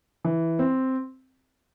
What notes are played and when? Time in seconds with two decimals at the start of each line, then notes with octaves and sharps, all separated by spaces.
0.25 E3
0.59 C4